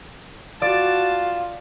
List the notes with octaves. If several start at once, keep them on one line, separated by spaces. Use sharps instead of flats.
F4 F#4 D5 A5